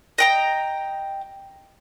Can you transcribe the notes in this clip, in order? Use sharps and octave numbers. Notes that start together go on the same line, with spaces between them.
D#5 G5 A#5